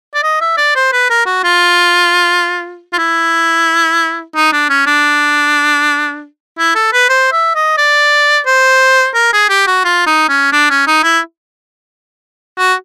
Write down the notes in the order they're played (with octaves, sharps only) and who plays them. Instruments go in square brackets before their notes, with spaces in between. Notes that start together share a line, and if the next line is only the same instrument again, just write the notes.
[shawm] D5
D#5
E5
D5
C5
B4
A#4
F#4
F4
F4
E4
D#4
D4
C#4
D4
E4
A4
B4
C5
E5
D#5
D5
C5
A#4
G#4
G4
F#4
F4
D#4
C#4
D4
C#4
D#4
E4
F#4